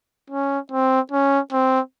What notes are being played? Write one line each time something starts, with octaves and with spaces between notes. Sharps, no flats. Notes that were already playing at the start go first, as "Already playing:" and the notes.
C#4
C4
C#4
C4